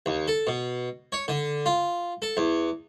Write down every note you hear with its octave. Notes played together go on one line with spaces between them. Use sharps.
D#2
A4
B2
C#5
D3
F4
A4
E2